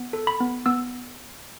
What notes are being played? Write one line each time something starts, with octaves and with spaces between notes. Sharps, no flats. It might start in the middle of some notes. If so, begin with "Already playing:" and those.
Already playing: B3
A4
B5
B3
B3 E6